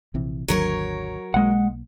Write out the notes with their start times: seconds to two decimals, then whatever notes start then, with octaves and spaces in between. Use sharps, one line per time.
0.14 A#1 C3 E3
0.48 G#1 D#2 D3 F#3 A#4 C#5
1.34 B1 G#3 A#3 F#5